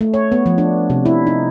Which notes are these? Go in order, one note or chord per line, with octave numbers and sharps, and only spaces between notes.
A3
C#5
B3
F3
D4
C3
E4
D#4